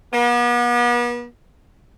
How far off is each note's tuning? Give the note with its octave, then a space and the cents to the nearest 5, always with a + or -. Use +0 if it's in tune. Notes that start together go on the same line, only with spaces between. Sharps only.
B3 -40